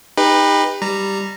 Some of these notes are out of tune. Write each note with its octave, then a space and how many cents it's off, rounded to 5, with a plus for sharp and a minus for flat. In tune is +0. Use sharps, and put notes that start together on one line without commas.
D#4 +0 G4 +35 B4 -5
G3 +0 A#5 -15